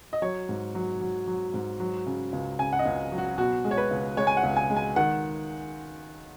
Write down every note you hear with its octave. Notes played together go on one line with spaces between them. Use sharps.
D#5
F#3 C#5
G#2
F#3
F#3
F#3
G#2
F#3
C#3
C#2
C#3 G#5
F#5
D#5
C#2
F#3
F#4
B2 F#4
G#3
C#5
B4
C#2
G#3 C#5
G#5
F#5
C#2
G#5
G#3
G#5
D#3 F#5